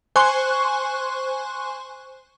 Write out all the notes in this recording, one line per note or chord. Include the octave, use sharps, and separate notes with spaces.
C5 G#5 C6 C#6 F#6